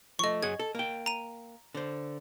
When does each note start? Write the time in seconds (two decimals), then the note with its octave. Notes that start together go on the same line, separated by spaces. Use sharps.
0.19 F3 A3 D#5 C#6
0.43 F#2 G#4 F#5 G#6
0.59 A4
0.75 A#3 G5
1.06 A#5 D#7
1.75 D3 C5